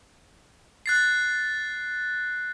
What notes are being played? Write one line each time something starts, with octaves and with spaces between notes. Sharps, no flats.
F#6 A6 C7